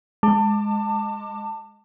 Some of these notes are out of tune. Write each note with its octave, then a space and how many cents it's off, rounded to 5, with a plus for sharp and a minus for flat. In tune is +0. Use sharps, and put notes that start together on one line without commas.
G#3 +0 A5 +25 D6 +20